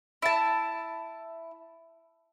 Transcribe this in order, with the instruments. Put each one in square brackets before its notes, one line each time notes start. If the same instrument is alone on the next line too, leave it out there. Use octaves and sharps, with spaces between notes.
[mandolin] E4 A5